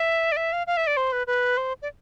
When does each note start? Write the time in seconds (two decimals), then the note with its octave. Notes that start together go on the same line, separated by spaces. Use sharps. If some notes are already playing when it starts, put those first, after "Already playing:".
Already playing: E5
0.32 D5
0.37 E5
0.53 F5
0.67 F5
0.77 E5
0.87 D5
0.97 C5
1.12 B4
1.27 B4
1.57 C5
1.82 D5